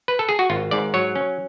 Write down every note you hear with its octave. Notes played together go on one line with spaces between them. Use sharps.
B4
A4
G#4
F#4
G#1 F4
G#2 D5
F#3 C#5
C#4